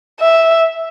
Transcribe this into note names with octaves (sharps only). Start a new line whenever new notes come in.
E5